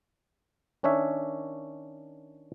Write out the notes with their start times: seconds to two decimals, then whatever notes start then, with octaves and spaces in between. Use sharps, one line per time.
0.83 D#3 C#4 D4 C#5 E5